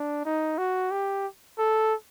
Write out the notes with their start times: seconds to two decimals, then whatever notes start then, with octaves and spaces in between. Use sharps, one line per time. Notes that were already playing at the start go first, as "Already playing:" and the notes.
Already playing: D4
0.25 D#4
0.58 F#4
0.91 G4
1.59 A4